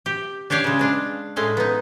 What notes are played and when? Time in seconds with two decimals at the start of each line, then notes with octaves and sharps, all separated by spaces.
0.06 G4
0.50 D4 G4 C#5 D5 F5
0.64 C#3 G#3
0.79 G#3 D4 F5
1.36 A2 G#3 A3 F5
1.57 B3 D#4